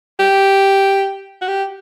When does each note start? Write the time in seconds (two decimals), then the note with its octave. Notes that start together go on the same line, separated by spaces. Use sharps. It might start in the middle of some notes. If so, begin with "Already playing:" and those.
0.20 G4
1.42 F#4
1.48 G4